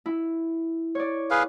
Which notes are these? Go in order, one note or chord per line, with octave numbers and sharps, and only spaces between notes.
E4
C#5 D5
G#4 B4 F5